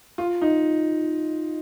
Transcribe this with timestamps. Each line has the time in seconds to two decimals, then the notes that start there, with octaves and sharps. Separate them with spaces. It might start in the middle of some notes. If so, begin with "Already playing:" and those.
0.18 F4
0.42 D#4